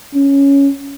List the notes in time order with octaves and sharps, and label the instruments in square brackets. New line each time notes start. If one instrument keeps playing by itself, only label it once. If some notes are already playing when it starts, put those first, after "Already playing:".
[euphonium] C#4